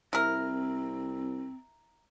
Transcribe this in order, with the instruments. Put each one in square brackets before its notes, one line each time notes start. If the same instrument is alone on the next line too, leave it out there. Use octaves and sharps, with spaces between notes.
[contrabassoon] C2 [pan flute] C4 [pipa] E4 A#4